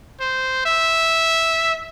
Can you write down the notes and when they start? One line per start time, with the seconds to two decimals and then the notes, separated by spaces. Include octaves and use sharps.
0.20 C5
0.66 E5